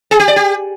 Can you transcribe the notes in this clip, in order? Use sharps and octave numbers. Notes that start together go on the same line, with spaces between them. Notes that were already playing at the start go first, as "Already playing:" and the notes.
G#4
G4
D5
G4